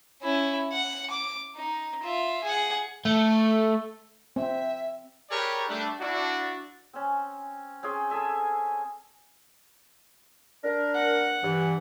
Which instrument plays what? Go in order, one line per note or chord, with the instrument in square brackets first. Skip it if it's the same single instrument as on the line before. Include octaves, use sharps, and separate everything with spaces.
[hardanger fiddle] C#4 E4
F#5
D6
D#4
F4 E5
G#4 F#5
[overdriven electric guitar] A3
[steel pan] C4 [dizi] E5
[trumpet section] G4 G#4 A#4 B4 C#5 D5
G3 A3 D4
D4 E4 F#4
[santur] C4 C#4
C4 C#4 G#4 G5
G#4 A4 E5 G#5
[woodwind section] D4 A#4
[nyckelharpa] F#5
[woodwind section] G2 E3